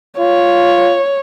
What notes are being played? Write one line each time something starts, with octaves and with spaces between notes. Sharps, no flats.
F4 C#5